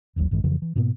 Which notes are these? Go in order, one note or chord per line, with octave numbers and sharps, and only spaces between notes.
D#1 G#1 D#2 F#3
A1 G2 D#3 G#3
F2 C#3 E3 F3
E3
G#2 B2 A#3 B3